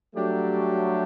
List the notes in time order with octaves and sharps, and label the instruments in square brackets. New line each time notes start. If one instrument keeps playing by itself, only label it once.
[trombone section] F#3 A3 [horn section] G3 D4 G4